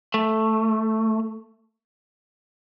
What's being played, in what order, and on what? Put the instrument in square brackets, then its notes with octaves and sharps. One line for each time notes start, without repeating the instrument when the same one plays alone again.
[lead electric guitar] A3